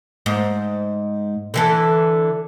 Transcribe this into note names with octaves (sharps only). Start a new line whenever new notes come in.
G#2
D3 E3 A4